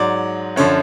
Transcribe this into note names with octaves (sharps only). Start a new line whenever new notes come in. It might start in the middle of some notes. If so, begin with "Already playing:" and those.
Already playing: G#2 F#3 D5
F#2 D3 F3 C#5